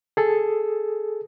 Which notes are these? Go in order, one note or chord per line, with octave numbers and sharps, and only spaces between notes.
G#4 A4